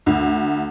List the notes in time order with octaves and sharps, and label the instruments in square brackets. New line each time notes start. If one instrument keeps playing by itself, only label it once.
[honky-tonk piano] D2